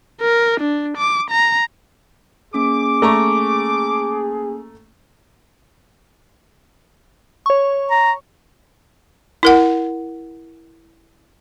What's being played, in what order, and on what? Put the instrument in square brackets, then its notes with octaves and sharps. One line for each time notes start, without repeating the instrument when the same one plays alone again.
[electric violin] A#4
D4
D6
A#5
[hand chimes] A#3 C#4 [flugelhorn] G#4 [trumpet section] D6
[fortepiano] A3 A#5 C#6
[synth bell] C#5 C#6
[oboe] A#5
[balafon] E4 A#4 F#5